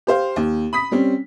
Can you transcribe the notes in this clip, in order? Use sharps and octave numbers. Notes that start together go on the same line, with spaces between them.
G4 C5 F5
D#2
B5 D#6 B6
G3 C4 C#4